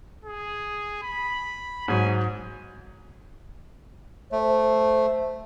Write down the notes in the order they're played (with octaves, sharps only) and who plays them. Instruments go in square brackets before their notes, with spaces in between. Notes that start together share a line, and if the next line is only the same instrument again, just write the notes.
[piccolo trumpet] G#4
B5
[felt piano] G#2 F#3 [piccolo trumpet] G#5
[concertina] A3 [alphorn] C5